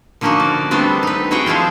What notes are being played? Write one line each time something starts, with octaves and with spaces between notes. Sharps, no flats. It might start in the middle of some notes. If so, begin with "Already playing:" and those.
D3 F3 A#3 C#4 D#4 F#4
D5
G3 A3 B3 C4 D4
D#4 B4
C4 F#4 G#4 E5 F#5 G5
F3 G#3 E4 F4